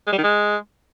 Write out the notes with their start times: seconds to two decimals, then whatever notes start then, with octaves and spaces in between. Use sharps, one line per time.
0.07 G#3
0.12 G3
0.18 D#3
0.23 G#3